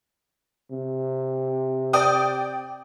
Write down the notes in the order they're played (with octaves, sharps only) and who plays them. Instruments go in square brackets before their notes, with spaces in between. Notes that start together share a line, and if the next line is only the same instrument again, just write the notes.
[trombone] C3
[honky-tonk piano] D5 G5 D#6